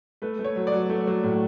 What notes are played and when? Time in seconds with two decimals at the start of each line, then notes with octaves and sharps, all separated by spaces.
0.22 A3 B4
0.39 A3
0.44 C#5
0.56 F#3
0.67 D5
0.72 F#3
0.90 A3
1.07 F#3
1.23 A2